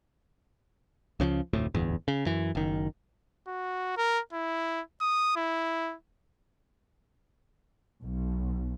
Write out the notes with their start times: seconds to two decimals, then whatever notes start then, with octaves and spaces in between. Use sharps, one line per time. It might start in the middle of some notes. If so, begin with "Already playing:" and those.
1.20 C#2 C#3 E3 F3
1.53 F1 D2 A2
1.74 D1 G1 E2
2.08 C#3
2.26 F#2 E3
2.55 F#1 D#3
3.48 F#4
3.97 A#4
4.33 E4
5.01 D#6
5.36 E4
8.02 B1 B2